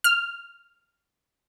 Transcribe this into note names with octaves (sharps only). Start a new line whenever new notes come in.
F6